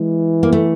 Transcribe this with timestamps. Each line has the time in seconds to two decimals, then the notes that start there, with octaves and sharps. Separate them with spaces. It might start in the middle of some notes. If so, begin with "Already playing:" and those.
Already playing: E3 G#3
0.43 A#3
0.53 A3